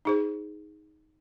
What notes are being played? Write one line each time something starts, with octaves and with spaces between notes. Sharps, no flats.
D#4 G#4 C5